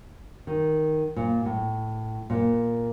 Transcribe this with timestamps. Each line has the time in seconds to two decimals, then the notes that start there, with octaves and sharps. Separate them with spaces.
0.47 D#3
1.16 A#2
1.46 A2
2.30 A#2